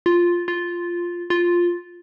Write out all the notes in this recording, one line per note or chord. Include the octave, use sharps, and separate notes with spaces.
F4
F4
F4